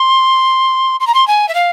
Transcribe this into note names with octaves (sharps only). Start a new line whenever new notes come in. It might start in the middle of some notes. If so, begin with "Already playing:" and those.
Already playing: C6
C6
A#5
C6
G#5
E5
F5